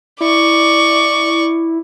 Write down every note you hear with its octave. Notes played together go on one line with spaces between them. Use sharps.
E4 D5 C#6